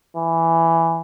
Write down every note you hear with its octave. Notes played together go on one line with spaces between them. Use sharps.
E3